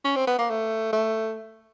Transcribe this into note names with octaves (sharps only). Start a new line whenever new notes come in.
C#4
C4
B3
A#3
A3
A3